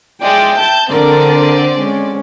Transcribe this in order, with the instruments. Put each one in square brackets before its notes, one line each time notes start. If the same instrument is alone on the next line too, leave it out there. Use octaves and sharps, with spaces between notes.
[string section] G#3 D5 [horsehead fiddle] E5 G5
[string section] A5 G6
[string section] D3 C4 D5 [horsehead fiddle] A4 A#4
[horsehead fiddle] G#3 C#4